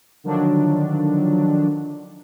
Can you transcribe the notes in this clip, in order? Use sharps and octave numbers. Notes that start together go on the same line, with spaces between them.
D3 D#3 F3 F#3 D4